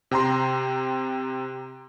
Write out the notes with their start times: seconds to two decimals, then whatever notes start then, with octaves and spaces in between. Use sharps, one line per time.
0.11 C3 G5 A#5 C6